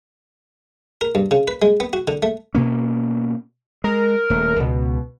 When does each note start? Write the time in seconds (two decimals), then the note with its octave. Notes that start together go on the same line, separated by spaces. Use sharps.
1.01 A#4
1.15 G2
1.31 C#3
1.48 B4
1.62 G#3
1.80 B3
1.93 F#4
2.08 D3
2.23 A3
2.55 B2 A#3 C#4
3.84 G#3 A#4
4.30 D#1 A3
4.60 C#2 B2